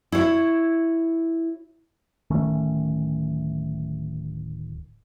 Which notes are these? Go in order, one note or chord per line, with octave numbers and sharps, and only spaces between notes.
E4 C#5
D1 D#3 A3 C#4